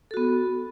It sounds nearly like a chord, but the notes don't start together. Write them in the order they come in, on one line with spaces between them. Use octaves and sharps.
A4 F#4 B3